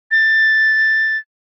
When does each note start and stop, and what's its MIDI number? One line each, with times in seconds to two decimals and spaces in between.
0.11 1.18 93